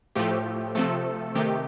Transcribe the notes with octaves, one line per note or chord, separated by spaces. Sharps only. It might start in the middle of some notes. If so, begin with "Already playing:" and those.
A2 F3 A3 G4
C3 F3 A3 A4
C3 D#3 A3 G4